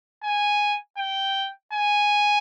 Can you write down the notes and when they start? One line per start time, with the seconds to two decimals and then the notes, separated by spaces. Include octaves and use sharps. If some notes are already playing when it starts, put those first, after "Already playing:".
0.23 G#5
0.97 G5
1.73 G#5